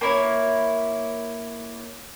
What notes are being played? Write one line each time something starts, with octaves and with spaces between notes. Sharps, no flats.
A#3 E4 C#5